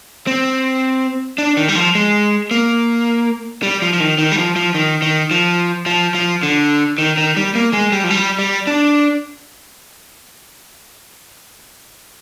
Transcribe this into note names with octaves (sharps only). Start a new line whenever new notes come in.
C4
D4
D#3
G3
F3
G#3
A#3
G3
F3
F3
D#3
D#3
G3
F3
F3
D#3
D#3
F3
F3
F3
D3
D#3
D#3
G3
A#3
G#3
G3
F3
G3
G3
D4